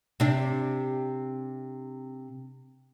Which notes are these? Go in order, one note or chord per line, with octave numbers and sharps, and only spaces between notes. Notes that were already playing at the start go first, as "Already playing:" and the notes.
C3 D4